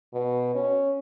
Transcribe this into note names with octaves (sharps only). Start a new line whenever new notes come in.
B2
C#4